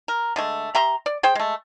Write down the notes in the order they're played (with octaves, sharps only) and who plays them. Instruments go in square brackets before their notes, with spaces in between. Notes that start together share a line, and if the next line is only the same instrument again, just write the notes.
[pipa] A#4
D3 G#3 A3
G4 E5 A#5 C6
D5
G#4 C5 G5
G#3 A3